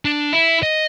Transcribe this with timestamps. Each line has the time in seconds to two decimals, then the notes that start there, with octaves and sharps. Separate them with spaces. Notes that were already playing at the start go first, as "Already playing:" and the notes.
0.05 D4
0.33 E4
0.63 D#5